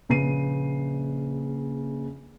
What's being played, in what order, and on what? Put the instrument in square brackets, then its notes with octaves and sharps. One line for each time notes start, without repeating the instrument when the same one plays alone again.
[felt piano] A#1 C#3 B4 C7 D#7